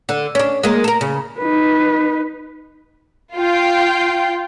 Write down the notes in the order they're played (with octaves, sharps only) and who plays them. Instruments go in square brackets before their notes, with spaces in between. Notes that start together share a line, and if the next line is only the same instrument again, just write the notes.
[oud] D3
C#4 D4
G#3 A#3
A4 A#4
C#3
[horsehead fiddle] D#4 B4
[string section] F4 G5